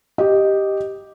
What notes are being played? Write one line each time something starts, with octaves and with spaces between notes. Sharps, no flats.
G4 D#5